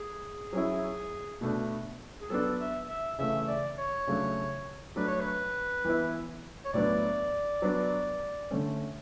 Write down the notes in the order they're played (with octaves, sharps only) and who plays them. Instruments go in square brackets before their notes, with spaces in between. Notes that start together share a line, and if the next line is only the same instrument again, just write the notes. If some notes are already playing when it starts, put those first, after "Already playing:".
Already playing: [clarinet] G#4
[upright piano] F#3 C#4 E4
B2 A3 D4
[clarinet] G#4
[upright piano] F#3 B3 D4 [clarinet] A4
[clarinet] E5
E5
[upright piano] C#3 E3 A3 [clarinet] E5
[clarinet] D5
C#5
[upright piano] C#3 F#3 A3 D4
[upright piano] F#3 A3 D4 [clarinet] B4
[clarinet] C#5
B4
[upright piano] E3 B3 E4
[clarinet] C#5
[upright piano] A2 F#3 B3 D4 [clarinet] D5
[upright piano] F#3 B3 D4
D3 A3 C#4